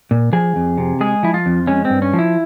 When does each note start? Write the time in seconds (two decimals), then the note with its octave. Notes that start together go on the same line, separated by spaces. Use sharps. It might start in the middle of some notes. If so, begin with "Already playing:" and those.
0.11 A#2
0.33 F3 G#4
0.56 F2
0.78 C3
1.01 G#3 G#4
1.23 F3 E4
1.34 F4
1.46 F2
1.67 G#3 C#4
1.85 C4
1.90 G2
2.02 C#4
2.14 F3
2.19 E4